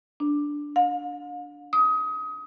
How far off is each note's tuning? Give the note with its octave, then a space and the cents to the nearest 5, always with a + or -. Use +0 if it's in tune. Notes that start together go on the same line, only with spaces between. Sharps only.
D4 -5
F5 +40
D#6 +25